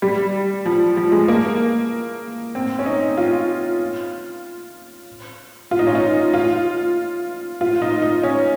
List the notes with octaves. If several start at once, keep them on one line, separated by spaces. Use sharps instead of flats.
G3
F3
F3
G#3
A#3
C4
C#4
D#4
F4
F4
D#4
C#4
D#4
F4
F4
D#4
D#4
C#4